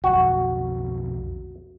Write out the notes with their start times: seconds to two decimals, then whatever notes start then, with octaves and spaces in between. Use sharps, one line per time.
0.04 B1 F2 F#4